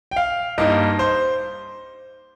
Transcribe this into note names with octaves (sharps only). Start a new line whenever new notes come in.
G5
F5
G2 G3 A#3 D#4 D#5
C5